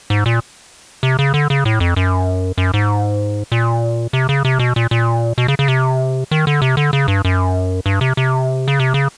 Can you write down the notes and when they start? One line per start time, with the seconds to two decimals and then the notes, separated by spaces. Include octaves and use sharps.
0.10 G#2
0.26 A#2
1.03 C3
1.19 C#3
1.34 D3
1.50 C#3
1.65 A2
1.80 F2
1.96 F#2
2.58 F#2
2.74 G#2
3.52 A#2
4.13 C3
4.29 C#3
4.45 C3
4.59 B2
4.76 A#2
4.91 A#2
5.38 B2
5.48 C#3
5.59 C#3
5.68 C3
6.31 D#3
6.47 D3
6.62 C3
6.77 D3
6.93 C#3
7.08 G2
7.25 F#2
7.86 G2
8.01 C3
8.17 C3
8.68 C#3
8.79 C3
8.94 C#3